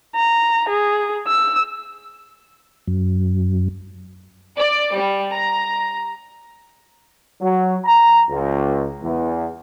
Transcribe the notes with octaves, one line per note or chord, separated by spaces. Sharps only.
A#5
G#4
E6
F#2
D5
G3
A#5
F#3
A#5
C#2
E2